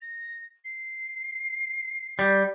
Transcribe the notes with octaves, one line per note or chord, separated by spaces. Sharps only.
A#6
C7
G3